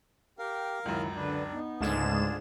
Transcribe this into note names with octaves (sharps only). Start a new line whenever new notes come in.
G4 A#4 F5 G5
C#2 F#2 D#3 F#3 E4
D3 D4 B4
B3 D#4
C#2 G#2 D3 A3 D4 F4 G#4 E7